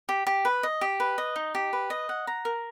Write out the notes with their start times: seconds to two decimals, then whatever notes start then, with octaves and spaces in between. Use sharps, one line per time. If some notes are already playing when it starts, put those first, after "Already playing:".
0.09 G4
0.27 G4
0.45 B4
0.63 D#5
0.81 G4
1.00 B4
1.18 D#5
1.36 D#4
1.55 G4
1.73 B4
1.90 D#5
2.09 F#5
2.27 A#5
2.45 A#4